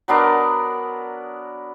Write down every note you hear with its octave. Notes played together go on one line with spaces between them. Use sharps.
F#3 B3 D4 A#4